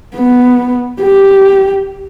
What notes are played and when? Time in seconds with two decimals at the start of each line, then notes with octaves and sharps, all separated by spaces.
0.15 B3
1.01 G4